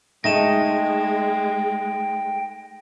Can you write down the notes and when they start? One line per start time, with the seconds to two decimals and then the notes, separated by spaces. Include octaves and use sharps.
0.24 G#3 A3 D#4 G5 A#6 E7